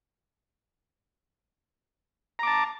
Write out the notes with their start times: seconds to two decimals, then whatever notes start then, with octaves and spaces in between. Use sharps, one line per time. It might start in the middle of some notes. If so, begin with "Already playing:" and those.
2.39 A#5
2.43 D6
2.47 A5